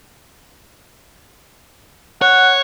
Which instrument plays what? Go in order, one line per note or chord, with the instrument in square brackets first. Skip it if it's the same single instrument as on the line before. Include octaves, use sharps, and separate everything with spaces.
[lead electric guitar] C#5 [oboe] F#5